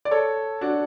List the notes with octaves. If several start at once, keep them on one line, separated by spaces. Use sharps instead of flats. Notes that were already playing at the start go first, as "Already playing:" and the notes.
D5
A4 C#5
D4 F#4